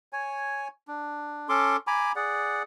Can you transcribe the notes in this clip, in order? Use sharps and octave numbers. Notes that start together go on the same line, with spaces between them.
C#5 G#5
D4
C#4 A4 C6 D6
G#5 A#5 B5 D6
G#4 D5 F#5